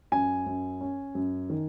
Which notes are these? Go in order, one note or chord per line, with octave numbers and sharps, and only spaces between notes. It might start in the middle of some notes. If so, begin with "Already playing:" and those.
F#2 G#5
F#2
C#4
F#2
D#3